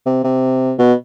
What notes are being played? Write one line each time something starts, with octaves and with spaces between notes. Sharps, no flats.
C3
C3
B2